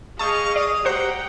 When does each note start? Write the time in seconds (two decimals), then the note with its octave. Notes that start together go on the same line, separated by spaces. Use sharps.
0.19 G#4 D#5 F5 A5 C#6 D#6 G6
0.56 D5 D#6
0.85 F#4 G4 C5 F#5 G5 A#5 F#6